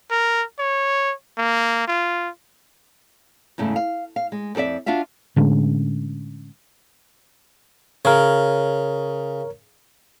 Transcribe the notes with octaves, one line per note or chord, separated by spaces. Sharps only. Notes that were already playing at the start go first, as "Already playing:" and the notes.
A#4
C#5
A#3
F4
E2 G#2 C#3 A3
F5
F5
G#3
F2 C4 A4 D5 E5
D4 F4 F#4 E5 F5
A2 D3 G#3 C#4
C#3 A#4 C#5